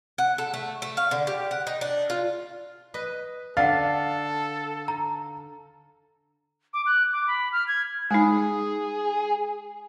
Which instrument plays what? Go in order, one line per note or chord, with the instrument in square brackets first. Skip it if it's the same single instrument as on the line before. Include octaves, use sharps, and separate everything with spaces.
[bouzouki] F#5
A4
A3
A3
F5
D3
G4
F#5
D#4
D4
F4
[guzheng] B4 D#5
[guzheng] D3 [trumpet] A4 [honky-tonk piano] F5 [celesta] F#5 A6
[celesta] A#5
[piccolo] D6
F#6
D6
B5
F6
G#6
[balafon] G#3 D#4 [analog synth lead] G#4